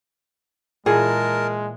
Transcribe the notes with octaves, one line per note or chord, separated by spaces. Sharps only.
A#2 E3 G#3 G#4 A#4 A5